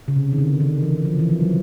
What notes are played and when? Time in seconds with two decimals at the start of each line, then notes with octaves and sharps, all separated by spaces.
0.08 C#3
0.16 C3
0.33 D#3
0.38 D3
0.60 D#3
0.83 E3
1.05 F3
1.19 E3
1.30 F3
1.41 F#3